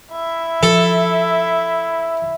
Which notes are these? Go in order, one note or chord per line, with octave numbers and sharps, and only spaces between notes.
E4 E5
F3 A4